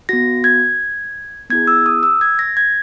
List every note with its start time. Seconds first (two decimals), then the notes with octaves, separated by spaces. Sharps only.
0.09 B3 F#4 A#6
0.44 G#6
1.50 B3 E4 G#4 G#6
1.67 E6
1.86 D#6
2.03 E6
2.21 G#6
2.39 A#6
2.57 G#6